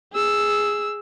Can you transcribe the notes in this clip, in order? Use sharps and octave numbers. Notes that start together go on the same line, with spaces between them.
G#4 E6